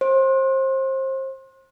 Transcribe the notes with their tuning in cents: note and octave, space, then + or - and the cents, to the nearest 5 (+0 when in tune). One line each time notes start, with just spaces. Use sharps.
C5 +30